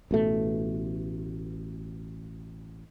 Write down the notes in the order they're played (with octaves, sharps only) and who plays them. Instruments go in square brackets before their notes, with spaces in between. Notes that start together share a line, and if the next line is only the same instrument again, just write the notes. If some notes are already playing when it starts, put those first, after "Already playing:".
[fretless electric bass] A1 B2 A3